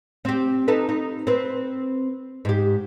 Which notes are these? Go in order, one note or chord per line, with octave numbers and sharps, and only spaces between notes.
C4 G4
D#4 A4 B4
D#4
C4 B4
G#2 G4